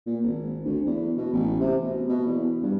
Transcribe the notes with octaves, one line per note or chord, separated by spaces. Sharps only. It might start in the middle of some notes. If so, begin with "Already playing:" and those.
A#2
G#1
D2
E2
B2
A1
C3
B2
B2
E2
G2